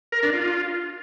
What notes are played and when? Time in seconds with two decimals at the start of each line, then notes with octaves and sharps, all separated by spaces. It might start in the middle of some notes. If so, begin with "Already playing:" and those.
0.12 A#4
0.23 D4
0.33 F4